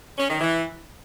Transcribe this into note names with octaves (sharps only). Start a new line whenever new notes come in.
C#4
D#3
E3